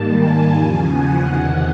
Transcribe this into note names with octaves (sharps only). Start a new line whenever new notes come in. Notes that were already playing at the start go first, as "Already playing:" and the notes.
Already playing: G#2 D#3 G3 A#3 A5
G#5
E2 C#3 F3
F#5
E2 C3 D#3